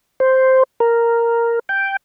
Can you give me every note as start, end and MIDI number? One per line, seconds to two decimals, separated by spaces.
0.20 0.63 72
0.80 1.59 70
1.69 1.96 79